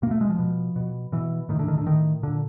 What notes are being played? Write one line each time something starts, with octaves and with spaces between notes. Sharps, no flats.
B2 A#3
A3
G#3
F3
B2
B2
B2 E3
A2 D#3
D3
D#3
D3
A2 D#3
A#2 D3